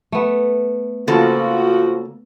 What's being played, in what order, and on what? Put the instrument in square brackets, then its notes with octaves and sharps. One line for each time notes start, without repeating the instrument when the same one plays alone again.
[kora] A3 B3
[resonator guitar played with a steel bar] C#3 A#3 A4 [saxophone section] F3 F#4